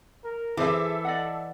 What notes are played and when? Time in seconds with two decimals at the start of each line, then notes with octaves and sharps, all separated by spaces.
0.24 A#4
0.57 E3 G#4 A4 C5 E5 D6
1.05 D5 D#5 F#5